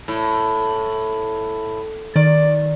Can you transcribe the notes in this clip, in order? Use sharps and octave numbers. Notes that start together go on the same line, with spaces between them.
A2
D#3 D5